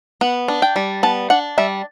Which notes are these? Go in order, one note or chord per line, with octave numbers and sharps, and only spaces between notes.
B3 F#5
D4
G5
G3
B3 A5
D4 F#5
G3 E5